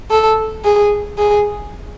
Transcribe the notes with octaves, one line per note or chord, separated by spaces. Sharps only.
A4
G#4
G#4